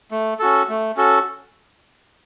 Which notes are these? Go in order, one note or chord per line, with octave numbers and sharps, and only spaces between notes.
A3
C#4 F#4 A4
A3
C#4 F#4 A4